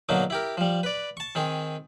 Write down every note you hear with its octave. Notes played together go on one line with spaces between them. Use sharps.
B2 D3 F#3 A#3 D#4
E4 G4 A#4
F3 G3
B4 D5
A5 C#6
D#3 C4 G#4